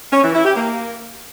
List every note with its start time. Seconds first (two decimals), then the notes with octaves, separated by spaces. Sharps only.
0.12 C#4
0.23 E3
0.34 E4
0.45 G4
0.55 A#3